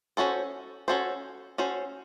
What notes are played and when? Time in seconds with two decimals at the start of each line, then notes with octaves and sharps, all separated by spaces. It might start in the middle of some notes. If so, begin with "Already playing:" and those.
0.17 C#4 F#4 A4 C5
0.88 C#4 F#4 A4 C5
1.58 C#4 F#4 A4 C5